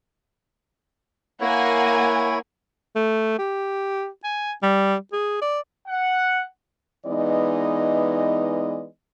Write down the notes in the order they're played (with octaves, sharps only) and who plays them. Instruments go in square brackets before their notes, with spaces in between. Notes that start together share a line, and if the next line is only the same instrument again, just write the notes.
[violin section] A#3 F#5 G#5 [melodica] E4 C#5
[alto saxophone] A3
G4
G#5
G3
G#4
D5
[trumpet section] F#5
[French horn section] E3 G#3 B3 D#4 D5 D#5